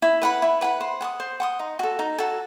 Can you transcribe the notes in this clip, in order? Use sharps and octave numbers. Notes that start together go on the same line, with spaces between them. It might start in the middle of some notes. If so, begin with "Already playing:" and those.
E4
B4 F#5 B5
E4
B4 F#5 B5
C5
F#5 C6 D#6
C5
F#5 C6 D#6
D#4
F#4 A4
D#4
F#4 A4